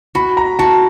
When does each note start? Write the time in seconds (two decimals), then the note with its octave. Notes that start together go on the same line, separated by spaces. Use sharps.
0.15 F#4 B5
0.37 A#5
0.59 F#4 A5